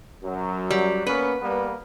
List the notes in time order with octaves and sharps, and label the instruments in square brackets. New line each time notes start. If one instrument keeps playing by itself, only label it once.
[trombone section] F#2 F#3
[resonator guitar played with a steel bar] G3
[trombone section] A#3 B3 C#4 [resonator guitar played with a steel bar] B4
[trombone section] G3 A#3 B3